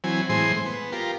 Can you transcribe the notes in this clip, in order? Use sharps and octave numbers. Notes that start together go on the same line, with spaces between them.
E3 F#3 C4 G#5
A2 E3 G#3 C5 G#5 C6
B3
F4 G4 A#4